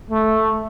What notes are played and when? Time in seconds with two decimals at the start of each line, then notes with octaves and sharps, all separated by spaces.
0.10 A3